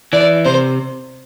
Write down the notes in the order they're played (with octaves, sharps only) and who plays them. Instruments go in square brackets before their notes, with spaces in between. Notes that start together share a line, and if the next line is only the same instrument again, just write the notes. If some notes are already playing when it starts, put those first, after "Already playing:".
[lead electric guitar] E3 [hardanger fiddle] D5
[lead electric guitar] C3 [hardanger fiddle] C5